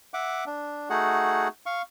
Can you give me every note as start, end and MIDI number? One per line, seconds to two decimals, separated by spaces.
0.14 0.44 76
0.14 0.44 78
0.14 0.44 86
0.46 0.89 62
0.90 1.48 57
0.90 1.48 63
0.90 1.48 66
0.90 1.48 68
0.90 1.48 78
1.66 1.82 77
1.66 1.82 85